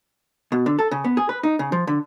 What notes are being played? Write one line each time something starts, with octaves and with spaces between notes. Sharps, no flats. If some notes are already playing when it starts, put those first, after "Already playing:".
B2
D3
A4
C#3
B3
G#4
B4
D#4
C#3
F3
D3